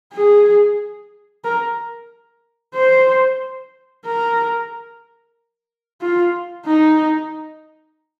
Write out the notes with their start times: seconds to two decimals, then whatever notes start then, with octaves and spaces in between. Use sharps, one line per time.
0.14 G#4
1.44 A#4
2.75 C5
4.06 A#4
6.02 F4
6.66 D#4